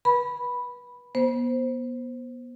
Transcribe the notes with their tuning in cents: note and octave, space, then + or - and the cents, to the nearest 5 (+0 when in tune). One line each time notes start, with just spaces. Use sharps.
B4 -30 B5 +0
B3 -30 C5 +0